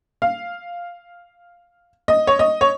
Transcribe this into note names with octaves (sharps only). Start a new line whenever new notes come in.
F5
D#5
C#5
D#5
C#5